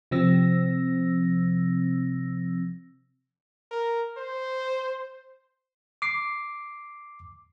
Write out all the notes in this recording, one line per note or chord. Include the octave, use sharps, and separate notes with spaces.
C3 F3 C4 E6 A#6
A#4
C5
D6 C7